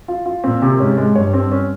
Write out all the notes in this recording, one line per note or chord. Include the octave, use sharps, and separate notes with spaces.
F4
F4
A#2 C4
C3
G#2 C#4
G#3
G2 C#5
C4
C#4